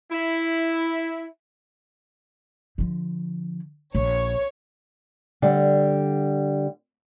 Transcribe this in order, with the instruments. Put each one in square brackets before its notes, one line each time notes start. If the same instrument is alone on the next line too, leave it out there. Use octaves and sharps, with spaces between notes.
[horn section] E4
[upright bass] D3 F3
[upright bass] A#1 [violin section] C#5
[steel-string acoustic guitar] D3 G3